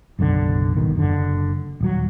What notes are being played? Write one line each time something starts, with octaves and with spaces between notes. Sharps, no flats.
F#1 B1 A#2 D3
D#1 G#1 B2 D#3
F#1 D3
D#1 F#3